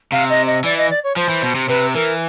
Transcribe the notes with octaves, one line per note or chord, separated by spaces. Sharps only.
C3 F5
D#5
D#5
E3 D5
D#5
D5
C#5
F3 C5
E3
B2
C3
C3 B4
E3 A#4